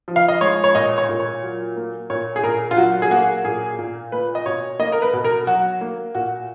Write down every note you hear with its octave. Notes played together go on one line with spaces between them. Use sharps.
F3
F5
D#5
G#3 C#5
C#5
A#2 D#5
C#5
A#2
C#5
F#3
A#3
A#2 C#5
G#4
A#2 A#4
F4
F#3 F#4
G#4
A#3 F#4
A#2 G#4
A#2
A#3 B4
D#5
B2 C#5
A#3 D#5
A#4
B4
B2
A#4
F#3 F#4
A#3
A#2 F#4